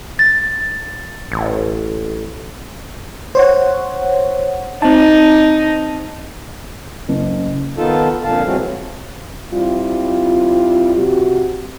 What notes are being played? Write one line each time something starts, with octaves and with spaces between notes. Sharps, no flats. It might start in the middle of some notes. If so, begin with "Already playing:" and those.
A6
A1
C5 C#5 F#5
C4 D#4 A5
F#1
D#3 B3 D#4 F4 A4 A5
F2 A#2 D3 F5 A5
B2 E3 F#3 G#3 C4
G3 C4 E4 F4
C3 F#4 G4